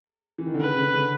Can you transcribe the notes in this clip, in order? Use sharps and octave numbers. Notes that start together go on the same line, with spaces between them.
E3
D#3
D3
C#3 B4
C#3
D3
C#3
D3